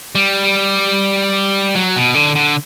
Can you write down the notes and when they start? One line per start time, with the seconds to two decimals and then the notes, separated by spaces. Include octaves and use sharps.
0.15 G3
1.75 F#3
1.96 B2
2.15 D3
2.35 D3